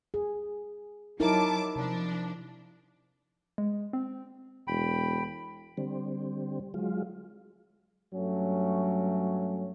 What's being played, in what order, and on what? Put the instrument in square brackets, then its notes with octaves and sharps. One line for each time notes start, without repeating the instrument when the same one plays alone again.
[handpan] G#4
[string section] F#3 A5 D6 [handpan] D#4 E4 A#4
[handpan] C3 [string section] F3 D4
[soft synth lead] G#3
C4
[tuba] E1 [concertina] G5 B5
[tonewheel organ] D3 G3 C4
F#3 G#3 F4
[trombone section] G2 F#3 A3 C#4